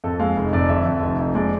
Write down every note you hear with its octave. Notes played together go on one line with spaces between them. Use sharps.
F2 A4
G#3 F5
F1
F2 D5
D3 E5
F2
F1
F2
G#3 D5